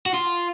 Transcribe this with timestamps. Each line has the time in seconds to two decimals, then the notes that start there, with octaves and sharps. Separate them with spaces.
0.06 F#4
0.14 F4